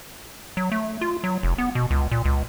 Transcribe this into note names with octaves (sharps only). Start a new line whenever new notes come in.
F#3
A3
F4
F#3
F1
B3
B2
C#2
A#2
C#2